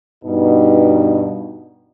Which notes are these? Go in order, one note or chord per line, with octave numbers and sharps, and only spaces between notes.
G2 B2 D#4